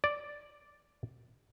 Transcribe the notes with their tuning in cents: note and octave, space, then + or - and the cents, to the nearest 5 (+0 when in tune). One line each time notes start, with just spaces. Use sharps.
D5 +0